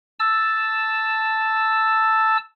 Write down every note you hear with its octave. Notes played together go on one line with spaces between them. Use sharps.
A5 E6